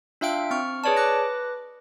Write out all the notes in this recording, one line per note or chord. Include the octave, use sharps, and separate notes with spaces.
D4 F4 E5 F5 G5 D7
C4 C#6 F6
G#4 B4 C#5 D5 A5
B4 D6 F#6 A#6